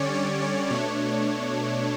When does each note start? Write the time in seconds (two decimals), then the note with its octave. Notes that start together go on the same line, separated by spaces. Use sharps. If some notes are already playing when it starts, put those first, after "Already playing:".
Already playing: D3 G3 C#4 C#5 D5
0.14 C#5
0.42 C#5
0.70 B2 A3 D4 C#5